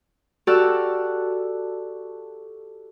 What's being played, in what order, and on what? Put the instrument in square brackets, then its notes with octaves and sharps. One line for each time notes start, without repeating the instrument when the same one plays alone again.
[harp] F#4 G4 A4 D5 E6 F6